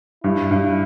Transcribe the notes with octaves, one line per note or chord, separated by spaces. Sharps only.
G2 E4
G2